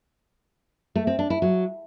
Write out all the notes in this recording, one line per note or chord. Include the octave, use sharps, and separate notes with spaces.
A3
C4
D4
E4
F#3